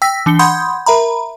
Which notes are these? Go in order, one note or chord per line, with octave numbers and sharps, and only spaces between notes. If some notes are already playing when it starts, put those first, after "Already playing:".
G5 E6 A#6 B6
E3 D4 C#7 G7
F#5 B5 C6 D#6 G6 G#6
A#4 E5 A#5 B5